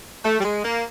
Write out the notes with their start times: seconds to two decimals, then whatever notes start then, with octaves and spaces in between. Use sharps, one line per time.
0.24 A3
0.39 G3
0.43 G#3
0.63 A#3